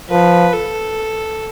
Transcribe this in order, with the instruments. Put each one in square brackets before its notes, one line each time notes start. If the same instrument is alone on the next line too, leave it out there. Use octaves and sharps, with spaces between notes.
[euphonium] F3 [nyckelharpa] B4
[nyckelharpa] A4